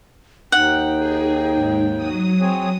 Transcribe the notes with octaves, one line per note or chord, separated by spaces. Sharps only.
D#2 D#4 F#5 G5
G#4
G#2
F#3 D#6
C4 G#4 C#5